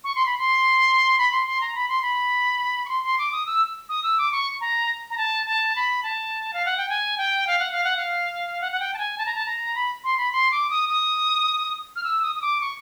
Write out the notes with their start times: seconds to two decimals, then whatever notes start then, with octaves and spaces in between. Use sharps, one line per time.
0.04 C#6
0.15 C6
0.26 B5
0.38 C6
1.18 B5
1.32 C6
1.47 C6
1.61 A#5
1.75 B5
1.89 C6
2.02 B5
2.86 C#6
2.89 C6
3.04 C6
3.18 D6
3.32 D#6
3.46 E6
3.89 D#6
4.03 E6
4.18 D6
4.32 C#6
4.61 A#5
5.10 A#5
5.17 A5
5.46 A5
5.76 B5
6.03 A5
6.53 F5
6.65 F#5
6.77 G5
6.89 G#5
7.18 G5
7.47 F5
7.59 F#5
7.71 F5
7.84 F#5
7.97 F5
8.61 F#5
8.72 F#5
8.80 G5
8.94 A5
8.98 G#5
9.18 A5
9.26 A#5
9.35 A5
9.46 A#5
9.75 B5
10.04 C6
10.18 B5
10.32 C6
10.51 D6
10.70 D#6
10.89 D#6
11.96 F6
12.04 E6
12.22 D#6
12.35 D#6
12.42 D6
12.61 C#6